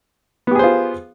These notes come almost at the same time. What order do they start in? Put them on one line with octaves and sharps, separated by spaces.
B3 G4 G#4 C5 F4